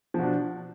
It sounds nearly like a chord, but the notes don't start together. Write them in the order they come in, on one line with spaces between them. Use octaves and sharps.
F3 B2 D4